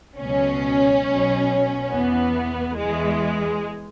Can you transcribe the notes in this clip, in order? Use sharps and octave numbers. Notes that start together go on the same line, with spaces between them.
C#2 B2 F#3 C#4
B1 B2 F#3
E2 E3 B3
E2 E3 G#3